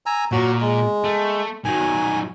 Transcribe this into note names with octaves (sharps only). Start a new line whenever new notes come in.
G#5 A#5 E6
A#2 F#3 F#4
G#3
A3
D#3 F#3 G#5